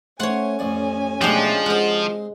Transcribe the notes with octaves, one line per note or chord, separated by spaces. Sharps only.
A3 C#4 C5 C#5 F#5 G#5
A1 F2 D5
B1 F3 G#3 A3 D4 G4 A#5
G#3 C4 D#5 F#5